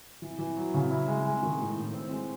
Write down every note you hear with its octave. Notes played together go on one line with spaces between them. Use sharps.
E3
E3
F#3
C#3
E4
G#3
G#3
D#3
A2
A2
C4
G#3